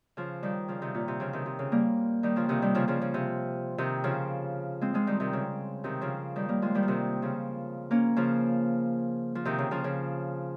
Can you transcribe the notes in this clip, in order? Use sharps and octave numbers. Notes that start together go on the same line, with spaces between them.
C#3 F3
D#3 G3
C#3 F3
C3 D#3
A#2
C3
C#3 F3
C3 D#3
C3
C#3
G3 A#3
D#3 G3
C#3 F3
C3 D#3
D#3 G3
C#3 F3
C#3 F3
C#3
C3
C3 D#3
C#3 F3
G#3 C4
F3 G#3
D#3 G3
C3 D#3
C#3
C3 D#3
C#3 F3
D#3 G3
G3 A#3
F3 G#3
D#3 G3
F3
C3 D#3
C#3 F3
A#3 C#4
C#3 F3
F3
C3 D#3
C#3
C#3 F3
C#3